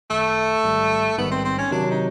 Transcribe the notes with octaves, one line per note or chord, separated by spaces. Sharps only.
G#1 F#2 D#3 A3
A#1 G#2 D#3 G3
A#1 G#2 D#3 G3 B3
C4
C4
C#4
C3 D#3 F#3 D4
D#4